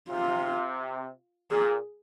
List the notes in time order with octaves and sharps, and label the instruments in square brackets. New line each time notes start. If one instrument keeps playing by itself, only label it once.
[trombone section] C3 [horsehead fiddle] F4
[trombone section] A#2 [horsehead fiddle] G#4